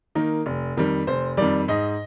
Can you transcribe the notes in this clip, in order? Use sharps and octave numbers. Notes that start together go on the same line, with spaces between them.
D#3 A#3 D#4
F1
F2 D#3 G3
F1 C5
F2 D#3 G3 D5
G#2 D#5